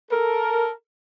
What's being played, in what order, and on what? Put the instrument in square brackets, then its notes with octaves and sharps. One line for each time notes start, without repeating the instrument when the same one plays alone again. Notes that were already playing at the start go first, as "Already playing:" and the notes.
[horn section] A4 A#4